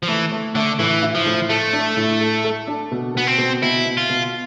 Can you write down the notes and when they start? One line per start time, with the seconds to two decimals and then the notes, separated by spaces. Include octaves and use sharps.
0.03 F3
0.08 E3 A3
0.32 A3
0.55 D3 A3
0.79 A2 E3
1.02 E4
1.15 F3
1.26 A2
1.50 A3 A4
1.73 D4
1.97 A2
2.21 A4
2.44 A4
2.67 D4
2.91 B2
3.15 B2 B3
3.27 C4
3.38 B2
3.62 B2 E4
3.86 B2
3.97 F4
4.09 B2